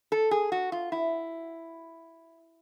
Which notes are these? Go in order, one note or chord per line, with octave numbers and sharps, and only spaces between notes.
A4
G#4
F#4
F4
E4